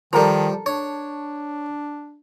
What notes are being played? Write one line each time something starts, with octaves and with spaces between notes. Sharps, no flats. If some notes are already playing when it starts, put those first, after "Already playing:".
D#3 F3 G3 A4 A#4 A#5
D4 C#5